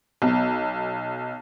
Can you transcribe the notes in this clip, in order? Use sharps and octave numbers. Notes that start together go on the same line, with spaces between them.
B1 B3